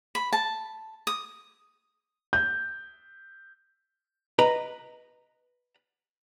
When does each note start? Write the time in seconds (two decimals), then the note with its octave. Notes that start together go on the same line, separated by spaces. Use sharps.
0.15 B5
0.33 A5
1.07 D#6
2.33 G6
4.39 B4 D#5 A#5